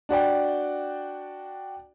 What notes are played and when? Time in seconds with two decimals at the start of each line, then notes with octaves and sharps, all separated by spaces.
0.09 D4 F#4 D5 G5